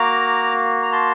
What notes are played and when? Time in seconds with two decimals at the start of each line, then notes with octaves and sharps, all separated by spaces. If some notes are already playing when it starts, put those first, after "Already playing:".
Already playing: A#3 F#4 A#5 D6
0.82 A#5
0.92 A5 C6